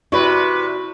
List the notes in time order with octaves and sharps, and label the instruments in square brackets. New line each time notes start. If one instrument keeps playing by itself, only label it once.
[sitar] C3 B4 [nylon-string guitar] E4 D5 [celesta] F#4 C#6